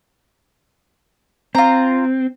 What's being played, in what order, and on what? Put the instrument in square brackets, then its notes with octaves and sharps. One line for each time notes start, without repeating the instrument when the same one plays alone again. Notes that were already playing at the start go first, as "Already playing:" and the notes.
[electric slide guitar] C4 [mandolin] F4 A#5